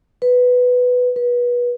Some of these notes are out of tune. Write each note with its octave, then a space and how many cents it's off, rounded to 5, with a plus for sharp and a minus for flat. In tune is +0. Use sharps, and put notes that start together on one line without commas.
B4 +5
B4 -25